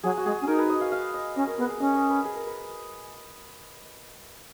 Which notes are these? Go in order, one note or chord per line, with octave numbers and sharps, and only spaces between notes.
F#3 G#4
F#4
G#3 G#4
C#4
D#4 A#4
B4
D#5
F5
F5
D#5
C#4 D#5
A#4
B3 G#4
G#4
C#4 D#5
D#5
B4
G#4
A#4
B4